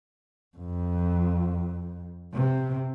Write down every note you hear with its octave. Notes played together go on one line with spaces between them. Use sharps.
F2
C3